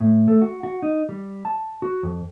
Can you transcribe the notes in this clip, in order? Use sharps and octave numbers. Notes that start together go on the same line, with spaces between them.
A2
A3
F#4
F#4
D#4
G3
A5
F#4
F2